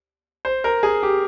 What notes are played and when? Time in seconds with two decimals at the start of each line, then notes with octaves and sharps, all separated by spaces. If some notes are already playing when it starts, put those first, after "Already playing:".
0.45 C5
0.64 A#4
0.83 G#4
1.03 G4